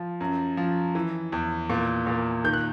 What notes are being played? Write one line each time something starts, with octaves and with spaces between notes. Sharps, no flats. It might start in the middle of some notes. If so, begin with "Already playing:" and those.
Already playing: F3
F#2
F3
E3
E2
A#2
A#2
D#3 G6
F#6